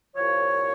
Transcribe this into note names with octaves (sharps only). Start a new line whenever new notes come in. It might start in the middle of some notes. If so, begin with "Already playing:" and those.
C2 A#2 F3 C#5